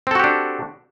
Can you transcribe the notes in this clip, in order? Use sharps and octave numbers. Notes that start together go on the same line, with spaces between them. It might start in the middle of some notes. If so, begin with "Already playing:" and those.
C4 D4 F#4 G4 A4